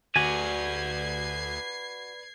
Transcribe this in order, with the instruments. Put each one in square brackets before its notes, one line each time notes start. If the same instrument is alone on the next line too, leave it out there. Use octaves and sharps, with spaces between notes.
[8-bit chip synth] D2 [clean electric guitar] F#4 G#5 [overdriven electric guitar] B4 D5 [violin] G#6 C7